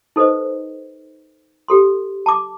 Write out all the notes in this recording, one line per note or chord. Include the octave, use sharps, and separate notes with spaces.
D#4 A4 B4 C5 D#5
G4 A4 C6
A5 D6